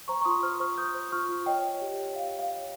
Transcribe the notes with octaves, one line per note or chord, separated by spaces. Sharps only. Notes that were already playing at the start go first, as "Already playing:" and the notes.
C5 A#5 C#6
C#6
F4 C6 D#6
C5 C#6 F6
C5 C#6 F6
C5 D#6 G6
C5
F4 C#6 F6
F4
C#5 D#5 G5
C#5
G4
C#5
G4 F5
C#5
F5
C#5